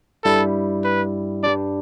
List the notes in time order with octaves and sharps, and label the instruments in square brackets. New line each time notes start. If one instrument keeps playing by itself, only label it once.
[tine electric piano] G2 G3 E4 [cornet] A4
[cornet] B4
[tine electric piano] G2 G3 D4 [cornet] D5